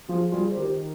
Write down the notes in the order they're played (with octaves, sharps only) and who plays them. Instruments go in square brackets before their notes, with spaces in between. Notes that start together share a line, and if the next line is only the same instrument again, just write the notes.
[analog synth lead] F3 [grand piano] F4 G#4
[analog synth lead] G3 [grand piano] F4 G#4
[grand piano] C5
[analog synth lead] D#3 [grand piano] G4 A#4